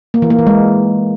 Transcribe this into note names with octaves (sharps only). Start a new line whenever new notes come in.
A#3
E3
A#3
E3
G#3